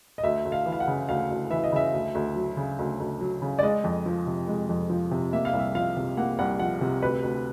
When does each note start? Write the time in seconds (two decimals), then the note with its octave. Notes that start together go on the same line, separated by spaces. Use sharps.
0.18 D#5
0.24 D2 E5
0.45 D2
0.52 F5
0.66 E3
0.72 F5
0.80 F#5
0.87 C#3
1.09 D2 F5
1.30 D2
1.51 E3 E5
1.64 D#5
1.72 C#3 E5
1.93 D2
2.15 D2
2.36 F#3
2.57 C#3
2.79 D2
3.00 D2
3.21 F#3
3.42 C#3
3.59 D5
3.63 G#3 D#5
3.84 F2
4.06 F3
4.27 C3
4.48 G#3
4.69 F2
4.90 F3
5.11 C3
5.33 A#3 E5
5.45 F5
5.53 C2
5.59 E5
5.75 F3 F5
5.97 C3
6.17 A#3 F#5
6.39 C2 F#5
6.59 F3 F#5
6.81 C3
7.02 D2 B4
7.23 D2